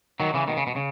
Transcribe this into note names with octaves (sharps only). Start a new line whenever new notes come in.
D#3 F#3
C#3 E3
B2 D#3
C#3
B2
C#3